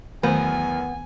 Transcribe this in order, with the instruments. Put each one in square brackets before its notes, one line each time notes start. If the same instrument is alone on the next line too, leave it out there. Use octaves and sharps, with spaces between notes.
[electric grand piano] E2 F#3 A#4 [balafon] D#3 A3 C5 [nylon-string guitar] B3 [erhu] G#5